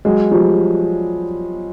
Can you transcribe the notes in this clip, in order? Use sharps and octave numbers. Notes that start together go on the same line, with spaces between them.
F#3 G#3
F3 G3